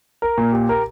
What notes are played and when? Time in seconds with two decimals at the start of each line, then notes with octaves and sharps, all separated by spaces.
0.22 A#4
0.38 A#2
0.53 G4
0.69 A#4